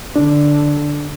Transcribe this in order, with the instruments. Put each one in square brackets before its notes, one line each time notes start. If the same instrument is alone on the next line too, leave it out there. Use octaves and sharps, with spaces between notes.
[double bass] D3 [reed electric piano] D4